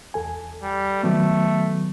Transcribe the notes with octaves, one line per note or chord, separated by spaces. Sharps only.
E2 A4 G#5
G3
D#3 F#3 A3 B3